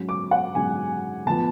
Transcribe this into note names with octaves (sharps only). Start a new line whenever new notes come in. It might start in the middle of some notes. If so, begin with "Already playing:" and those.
Already playing: G#2 F#3 C#4
D6
F#5
G#2 F#3 C#4 G#5
A2 F3 B3 A5